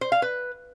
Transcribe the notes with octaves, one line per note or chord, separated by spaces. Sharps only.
C5
F5
B4